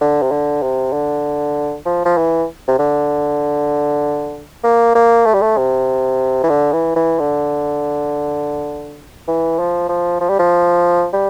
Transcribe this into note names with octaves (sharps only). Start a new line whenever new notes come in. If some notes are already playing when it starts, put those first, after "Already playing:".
D3
C3
D3
C3
D3
F3
F3
E3
C3
D3
A#3
A#3
A3
G3
A3
C3
E3
D3
E3
E3
D3
E3
F3
F3
F3
G3
F3
G3